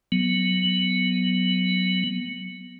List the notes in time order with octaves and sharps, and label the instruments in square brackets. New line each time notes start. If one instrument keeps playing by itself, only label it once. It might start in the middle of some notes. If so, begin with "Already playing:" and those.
[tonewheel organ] F#3 B3